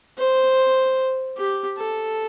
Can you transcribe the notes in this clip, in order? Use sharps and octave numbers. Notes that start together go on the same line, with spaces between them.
C5
G4
A4